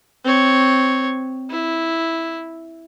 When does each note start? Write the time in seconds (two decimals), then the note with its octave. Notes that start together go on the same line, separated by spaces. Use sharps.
0.25 C4 C#5
1.50 E4